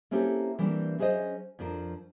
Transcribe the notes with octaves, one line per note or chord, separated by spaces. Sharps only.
A#3 C4 C#4 E4 G4 A4
E3 G3 A#3 C4 D4
F#3 C#4 G#4 A4 C5 D#5
F2 F3 D4 A#4